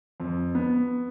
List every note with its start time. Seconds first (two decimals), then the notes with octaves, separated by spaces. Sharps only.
0.20 F2
0.55 B3